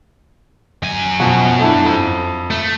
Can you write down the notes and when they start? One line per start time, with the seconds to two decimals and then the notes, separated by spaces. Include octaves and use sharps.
0.83 F#2 G#5
1.20 B2 F3 F#4
1.59 A3 D4 E4
1.86 F2
2.51 A3